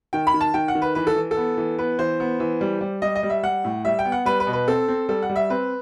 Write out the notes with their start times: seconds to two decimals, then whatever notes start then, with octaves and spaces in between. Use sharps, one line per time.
0.13 D#3 G5
0.27 B5
0.34 D#3
0.41 A5
0.54 D#3 G5
0.68 F#5
0.75 D#3
0.82 B4
0.95 E3 B4
1.07 A4
1.16 E3
1.31 A4
1.37 B3
1.57 E3
1.78 B3 B4
1.99 E3 C5
2.20 B3
2.40 E3
2.61 G3
2.81 G3
3.02 G3 D#5
3.16 D#5
3.23 G3
3.30 E5
3.43 G3 F#5
3.64 A2
3.85 G3 E5
3.99 G5
4.05 B3
4.12 F#5
4.25 G3 B4
4.40 B4
4.47 B2
4.53 B4
4.67 C4 A4
4.88 C4
5.09 G3 A4
5.22 F#5
5.30 G3
5.36 E5
5.50 C4 B4